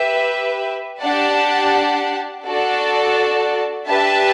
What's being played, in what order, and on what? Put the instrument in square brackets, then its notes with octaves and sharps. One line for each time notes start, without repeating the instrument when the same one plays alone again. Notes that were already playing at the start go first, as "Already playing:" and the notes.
Already playing: [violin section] G4 B4 E5
D4 G4 D5 F#5 A5
D4 F#4 A4 D5 A5
D4 G4 B4 E5 A5